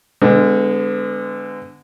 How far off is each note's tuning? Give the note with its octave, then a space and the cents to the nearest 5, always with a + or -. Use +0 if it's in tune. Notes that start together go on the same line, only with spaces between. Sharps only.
D3 +0 G#3 -20 B3 +35